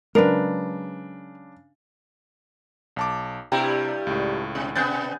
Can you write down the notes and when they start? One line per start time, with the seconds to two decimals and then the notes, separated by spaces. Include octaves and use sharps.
0.15 C#3 F#3 G#3 D4 A#4 B4
2.96 B1 A5 D6
3.52 G2 C3 G3 E4 G5 A#5
4.07 C#2 A2
4.55 B2
4.76 B2 B3 F#6 G6 A6